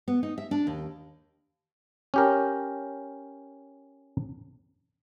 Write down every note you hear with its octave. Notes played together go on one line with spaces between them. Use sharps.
B3
D#4
E5
D4
D#2
C#4 G4 A#4